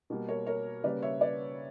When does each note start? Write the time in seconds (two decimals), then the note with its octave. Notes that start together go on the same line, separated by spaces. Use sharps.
0.10 B2 G3 A#3
0.29 A#4 C#5
0.46 A#4 C#5
0.84 C#3 G3 A#3 B4 D5
1.02 C#5 E5
1.21 B4 D5